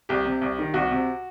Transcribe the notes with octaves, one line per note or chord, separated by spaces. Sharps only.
C2 G4
C3
C2
D#3
C2 F#4
C3